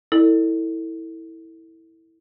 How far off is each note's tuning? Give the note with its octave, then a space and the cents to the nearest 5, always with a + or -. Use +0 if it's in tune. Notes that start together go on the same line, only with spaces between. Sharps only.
E4 -15 A4 +25 D5 +40